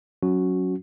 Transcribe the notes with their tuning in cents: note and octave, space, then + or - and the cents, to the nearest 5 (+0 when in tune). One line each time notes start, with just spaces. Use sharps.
F#3 +0 C#4 +0 F#4 -5